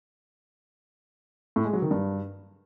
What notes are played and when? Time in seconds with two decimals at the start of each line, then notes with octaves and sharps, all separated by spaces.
1.56 A2
1.65 G#3
1.73 F#3
1.82 D#3
1.91 G2